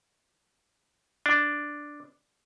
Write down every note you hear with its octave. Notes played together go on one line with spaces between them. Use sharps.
D4